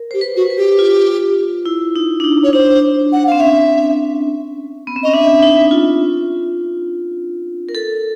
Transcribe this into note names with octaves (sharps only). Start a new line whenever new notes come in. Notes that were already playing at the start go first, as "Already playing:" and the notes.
Already playing: A#4
G4 C5
B4
F#4
B4
G4
F4
E4
D#4
D4
D#4
C#5
D4 C5
F#5
C4 F5
C#4 E5
B3
C4
C#4 D#5
D4 E5
D#4
F4
A#4
A4